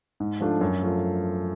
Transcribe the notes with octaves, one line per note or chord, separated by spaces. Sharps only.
G#2
F3 A3 D4 F4
F#2
F3 A3 F4